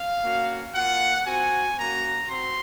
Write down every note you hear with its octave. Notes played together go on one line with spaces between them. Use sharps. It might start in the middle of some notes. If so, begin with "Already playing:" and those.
Already playing: F5
A#3 C#4 F#4
A#3 F4 F#5
C4 F#4 G#5
A#3 C#4 F#4 A#5
C4 F#4 C6